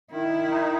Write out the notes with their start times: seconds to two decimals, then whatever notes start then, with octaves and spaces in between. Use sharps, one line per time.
0.11 D#3 E4
0.50 D#4